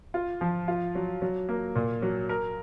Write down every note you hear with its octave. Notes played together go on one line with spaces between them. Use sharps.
F4
F3
F4
F#3
F#3
A#3
A#2
F#3
A#4